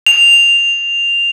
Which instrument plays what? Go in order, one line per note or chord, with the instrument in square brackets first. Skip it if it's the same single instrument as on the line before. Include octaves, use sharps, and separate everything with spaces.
[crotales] F7